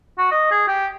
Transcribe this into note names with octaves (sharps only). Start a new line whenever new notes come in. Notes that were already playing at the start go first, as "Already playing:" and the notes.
F#4
D#5
G#4
G4